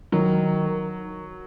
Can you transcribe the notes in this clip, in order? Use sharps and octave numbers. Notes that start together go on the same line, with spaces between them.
D#3 F#3